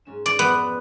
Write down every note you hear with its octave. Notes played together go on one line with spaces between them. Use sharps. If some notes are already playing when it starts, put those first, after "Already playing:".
G#2 C#4 E7
E4 B4 D5
F2 B2 B3